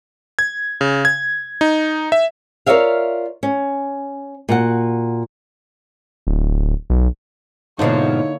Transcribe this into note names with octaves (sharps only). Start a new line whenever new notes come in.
G#6
C#3
G#6
D#4
E5
F4 A#4 C#5 D5 E5 F5
C#4
A#2 F#4 F#5
D1
B1
G#2 B2 D3 F3 A#3 D#4 E4 C#5